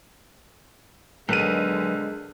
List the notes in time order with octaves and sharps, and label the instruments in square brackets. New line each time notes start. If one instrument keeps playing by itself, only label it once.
[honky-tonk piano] B1 D#7 [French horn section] D3 G#3 [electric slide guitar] F#3 A#4 B4